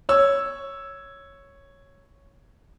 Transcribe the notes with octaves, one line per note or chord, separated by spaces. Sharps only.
C#5 E6